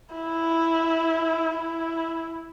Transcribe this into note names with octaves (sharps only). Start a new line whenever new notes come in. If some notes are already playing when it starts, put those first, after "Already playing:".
E4
E4